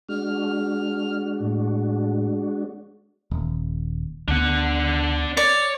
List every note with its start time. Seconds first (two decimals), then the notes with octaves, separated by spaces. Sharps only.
0.09 G#3 D4 F#4 F6
1.40 A2
3.31 D#1
4.28 D2 B3 D4 F#5
5.37 C#5 D5